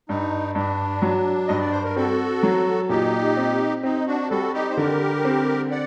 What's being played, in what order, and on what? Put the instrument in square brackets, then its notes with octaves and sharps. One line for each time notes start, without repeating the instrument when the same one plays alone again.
[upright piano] G2 [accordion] D#4
[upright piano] G2 [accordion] D4
[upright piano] F#3
[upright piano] G2 [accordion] D#5
[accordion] D5
C5
A#4
[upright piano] C4 [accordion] F#4 A4
[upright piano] F#3
[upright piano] A#2 [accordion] D#4 G4
[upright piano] C4
[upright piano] C4 [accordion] D#4
[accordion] D4 F#4
[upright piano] G3 [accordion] F#4 A4
[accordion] D#4 G4
C5
[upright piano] D3 [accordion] G4 A#4
[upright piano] C4
[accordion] D5 F#5